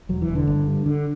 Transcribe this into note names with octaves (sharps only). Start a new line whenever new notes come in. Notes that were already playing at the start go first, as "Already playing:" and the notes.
E1 F#3
E3
E1
D3
G1
G2
D3